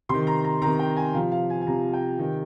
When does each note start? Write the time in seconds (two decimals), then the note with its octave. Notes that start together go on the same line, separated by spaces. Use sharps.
0.09 C3 D#3 C6
0.27 A#5
0.44 A#5
0.62 C3 D#3 A#5
0.79 G5
0.97 G#5
1.14 C3 F3 F5
1.32 F5
1.50 G#5
1.61 G#5
1.67 C3 F3 A#5
1.93 G5
2.19 C3 D#3